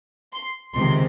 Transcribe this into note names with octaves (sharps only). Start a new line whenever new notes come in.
C6
C#2 C3 D#3 C6